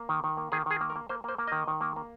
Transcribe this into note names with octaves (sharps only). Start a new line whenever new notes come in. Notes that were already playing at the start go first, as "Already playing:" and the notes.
Already playing: A#3
D#3
D#3
A#3
D#3 G#4
D#3 G#4
A#3
A#4
A#3
A#3 C5
A#3 C5
A#3
D#3 D#5
D#3
A#3
A#3